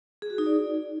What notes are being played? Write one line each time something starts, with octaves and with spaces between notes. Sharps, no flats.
G#4
F#4
D#4
D5